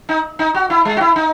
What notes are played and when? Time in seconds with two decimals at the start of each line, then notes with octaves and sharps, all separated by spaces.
0.09 D#4
0.39 D#4
0.55 F#4
0.70 E4
0.85 G#3
0.97 F#4
1.01 E4
1.16 D#4